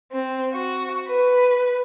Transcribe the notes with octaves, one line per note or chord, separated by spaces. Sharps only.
C4
F#4
B4